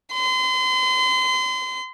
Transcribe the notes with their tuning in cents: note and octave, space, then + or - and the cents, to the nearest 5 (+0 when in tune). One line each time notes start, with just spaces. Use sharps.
C6 -35